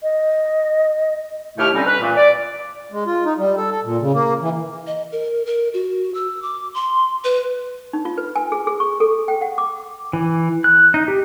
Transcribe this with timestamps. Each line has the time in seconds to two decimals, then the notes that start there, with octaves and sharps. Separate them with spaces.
0.03 D#5
1.58 D#2 B2 A3 E4 G4 F6
1.74 D3 G3 C4 C#4 D#4
1.86 B4
2.01 A#2 E3 A3 A#3
2.16 D5
2.92 G#3
3.06 F4
3.25 D#4
3.38 G3
3.57 A4
3.71 A4
3.84 A#2
4.01 C#3
4.14 A#3
4.41 E3
4.87 D#5
5.12 A#4
5.46 A#4
5.74 F#4
6.14 E6
6.42 D6
6.74 C6
7.24 B4
7.93 D#4
8.05 F4
8.18 B4
8.36 G#5
8.52 G#4
8.67 G#4
8.80 C#6
9.00 A4
9.28 G5
9.41 F#5
9.58 D6
10.13 E3
10.64 F#6
10.94 D#4
11.08 G4